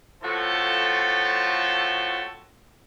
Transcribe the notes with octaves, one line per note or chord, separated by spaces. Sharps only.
A2 F3 F4 F#4 A4